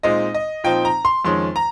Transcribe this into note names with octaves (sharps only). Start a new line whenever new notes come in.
A#2 G#3 C4 D#4 D#5
D#5
A#2 F3 C4 D#4 G5
A#5
C6
F2 D#3 G#3 C#4 C6
A#5